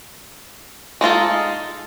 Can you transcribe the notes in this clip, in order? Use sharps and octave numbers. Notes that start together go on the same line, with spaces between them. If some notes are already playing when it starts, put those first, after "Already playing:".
G#3 D#4 F4 A4